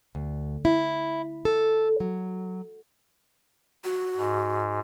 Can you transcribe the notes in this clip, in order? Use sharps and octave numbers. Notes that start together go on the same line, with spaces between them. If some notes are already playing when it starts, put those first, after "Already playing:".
D2
E4
A4
F#3
F#4
G#2